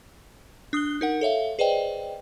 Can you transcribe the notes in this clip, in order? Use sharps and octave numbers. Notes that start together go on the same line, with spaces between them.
D4 D#6 F#6 G7
D#4 A#4 F#5
A4 C#5 E5 F5
G#4 B4 C5 D5 D#5 G5